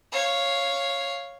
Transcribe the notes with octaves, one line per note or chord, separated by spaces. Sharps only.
C#5 F5